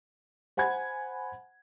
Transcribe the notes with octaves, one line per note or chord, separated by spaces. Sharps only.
C5 F#5 G#5 B5 G#6